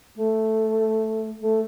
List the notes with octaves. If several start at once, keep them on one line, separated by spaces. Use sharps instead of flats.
A3
A3